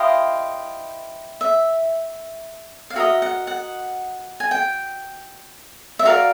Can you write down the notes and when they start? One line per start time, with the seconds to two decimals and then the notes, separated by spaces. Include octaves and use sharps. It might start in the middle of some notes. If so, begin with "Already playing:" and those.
Already playing: E4 G4 C5 D#5 F5
1.41 E5
2.90 F5
2.96 F#4 A#4 D#5 E5
3.22 F#5
3.47 F#5
4.40 G#5
4.51 G5
5.99 E5
6.05 F#4 A#4 D5 F5